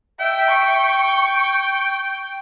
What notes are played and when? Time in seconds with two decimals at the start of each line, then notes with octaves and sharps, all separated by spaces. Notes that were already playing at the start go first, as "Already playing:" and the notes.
0.20 E5 G5
0.52 C#6